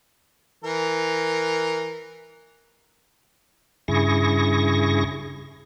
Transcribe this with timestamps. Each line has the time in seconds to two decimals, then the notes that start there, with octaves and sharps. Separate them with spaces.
0.64 E3 A#4
3.88 G2 C#3 E4 G#4 C#6 A#6